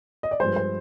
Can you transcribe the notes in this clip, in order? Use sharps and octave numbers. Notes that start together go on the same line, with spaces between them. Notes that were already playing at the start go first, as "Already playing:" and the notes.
D#5
D5
G2 F3 G#3 C5
C5